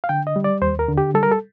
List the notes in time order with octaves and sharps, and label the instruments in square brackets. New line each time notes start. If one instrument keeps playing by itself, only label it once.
[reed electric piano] F5
D3 G5
D#5
G3
D5
D#2 C5
A#4
D3
G4
G3 A4
A#4
A4